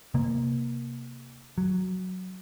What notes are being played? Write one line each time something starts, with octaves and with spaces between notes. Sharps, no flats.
C3 A#3
F#3